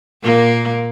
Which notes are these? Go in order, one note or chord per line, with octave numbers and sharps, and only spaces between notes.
A#2 A#3